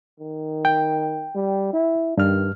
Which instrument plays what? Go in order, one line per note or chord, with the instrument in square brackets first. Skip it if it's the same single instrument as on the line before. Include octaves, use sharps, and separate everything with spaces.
[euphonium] D#3
[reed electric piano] G5
[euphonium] G3
E4
[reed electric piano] G2 F6 [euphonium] D#3